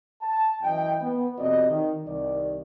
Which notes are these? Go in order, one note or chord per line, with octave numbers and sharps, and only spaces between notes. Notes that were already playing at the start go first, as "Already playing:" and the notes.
A5
F#2 E3 D#5 G5
B3
F2 C3 C4 F#4 D5 D#5
D#3
C2 D#3 D5